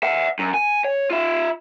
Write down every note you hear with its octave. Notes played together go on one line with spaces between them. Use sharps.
E5 F#5
F#2
G#5
C#5
F4 E5